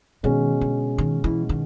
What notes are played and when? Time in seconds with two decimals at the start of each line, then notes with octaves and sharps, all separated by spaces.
0.23 B2 D#3 G#3 C#4
0.61 D3
0.98 D#3
1.24 E3
1.49 D#3